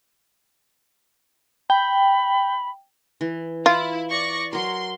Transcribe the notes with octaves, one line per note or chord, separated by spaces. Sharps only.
G5 B5
E3
E4 F4
D5 C#6 A#6
F#3 A#4 C6